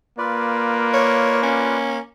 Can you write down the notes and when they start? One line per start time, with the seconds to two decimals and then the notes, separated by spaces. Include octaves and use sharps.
0.18 A#3 F4 B4 D5
0.94 C#5
1.43 C#4